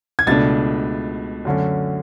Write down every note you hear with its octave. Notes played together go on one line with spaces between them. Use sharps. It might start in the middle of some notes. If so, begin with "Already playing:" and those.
G#6
C#2 B2 A3 D4 A6
F#2 D3 A3 C#4